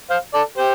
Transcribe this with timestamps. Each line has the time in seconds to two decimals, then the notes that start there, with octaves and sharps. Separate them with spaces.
0.10 C5 F5
0.34 A4 D5
0.57 G4 C5